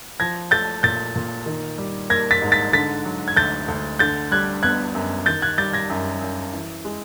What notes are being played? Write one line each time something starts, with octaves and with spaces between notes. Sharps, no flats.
F3 G#6 A#6
A3 G6 A6
A#2 G6 A6
A#2
D#3
G3
A#3 G#6 A#6
A6 B6
G#2
A6 B6
D3 A6 B6
F#3
G#6
D2 G6 A6
D2
D3 G6 A6
G3 F#6 G#6
B3 F#6 G#6
F#2
D#3 G6 A6
F#6 G#6
G3 G6 A6
G#6 A#6
F#2
F#2
E3
G#3